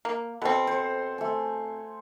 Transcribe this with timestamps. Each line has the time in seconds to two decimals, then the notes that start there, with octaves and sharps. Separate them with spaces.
0.05 A#3
0.42 B2 C4 A4 C5 F#5
0.67 C5
1.18 A3 G#5